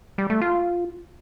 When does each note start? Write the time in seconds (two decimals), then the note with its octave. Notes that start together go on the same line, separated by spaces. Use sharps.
0.18 G3
0.30 A3
0.41 F4